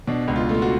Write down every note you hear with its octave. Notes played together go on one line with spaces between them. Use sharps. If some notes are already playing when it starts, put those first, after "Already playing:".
B2 D4
C#2
F4
A3
F4
F#4